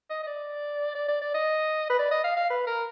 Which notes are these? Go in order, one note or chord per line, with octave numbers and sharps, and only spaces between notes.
D#5
D#5
D5
D5
D5
D5
D#5
B4
D5
D#5
F5
F5
B4
A#4